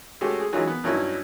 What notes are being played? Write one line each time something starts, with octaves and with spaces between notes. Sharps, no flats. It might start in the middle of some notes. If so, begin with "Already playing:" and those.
G#3 A3 C#4 F#4 G4
G#4
E3 F#3 G#3 C#4 D#4 F4
B3
G2 F#3 C#4 D#4 E4